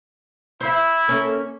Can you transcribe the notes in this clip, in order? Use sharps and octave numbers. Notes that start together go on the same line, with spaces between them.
E4 C5 E5
A#3 C#4 A4